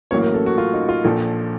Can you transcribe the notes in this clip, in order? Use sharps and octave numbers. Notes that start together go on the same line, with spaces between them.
A1 A2 F#3 A#3 C#4 C#5
A#4
A4
F#4
F4
D#4
F4
A#1 A#2 F3 A4